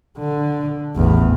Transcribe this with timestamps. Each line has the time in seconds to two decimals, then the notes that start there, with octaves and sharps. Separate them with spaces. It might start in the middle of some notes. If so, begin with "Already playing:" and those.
0.18 D3
0.96 A1 E2